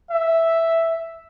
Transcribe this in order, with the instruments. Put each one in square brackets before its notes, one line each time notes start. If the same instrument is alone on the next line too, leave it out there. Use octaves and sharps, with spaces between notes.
[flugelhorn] E5